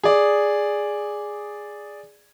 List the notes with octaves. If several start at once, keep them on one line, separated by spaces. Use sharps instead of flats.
G#4 D5